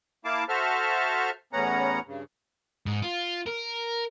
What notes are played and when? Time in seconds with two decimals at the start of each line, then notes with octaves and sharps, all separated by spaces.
0.25 A#3 E4 F5 A5 D6
0.49 F#4 A4 C5 E5 A5 F6
1.53 E2 A2 B3 C#4 F#5 A#5
2.07 G2 C#3
2.86 G#2
3.02 F4
3.46 A#4